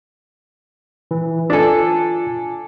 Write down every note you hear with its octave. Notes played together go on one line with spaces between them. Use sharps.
E3
D4 F4 A4 G#5